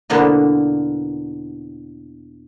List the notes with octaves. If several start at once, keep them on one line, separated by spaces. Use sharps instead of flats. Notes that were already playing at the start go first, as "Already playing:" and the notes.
E2 B2 D3 A#3 B3